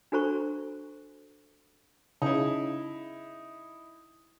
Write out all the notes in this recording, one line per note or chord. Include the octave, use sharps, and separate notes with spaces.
D4 F#4 A4 C5 A#5 C#6
C#3 D#4 E4